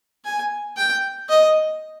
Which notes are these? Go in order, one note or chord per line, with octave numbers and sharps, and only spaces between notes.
G#5
G5
D#5